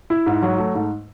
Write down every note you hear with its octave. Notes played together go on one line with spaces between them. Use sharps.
E4
G#2
F#3
A3
G#2